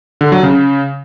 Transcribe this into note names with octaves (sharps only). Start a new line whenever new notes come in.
D3
F#3
C#3